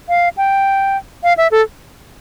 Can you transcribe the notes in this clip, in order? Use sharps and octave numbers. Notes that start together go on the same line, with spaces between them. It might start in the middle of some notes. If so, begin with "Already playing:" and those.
F5
G5
F5
E5
A4